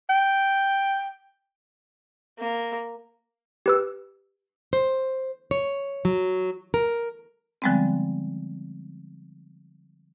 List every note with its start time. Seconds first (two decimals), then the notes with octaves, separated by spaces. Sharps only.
0.10 G5
2.39 A#3
3.66 G4 B4 E6
4.73 C5
5.51 C#5
6.05 F#3
6.74 A#4
7.62 D3 F3 G3 G#3 B3 C4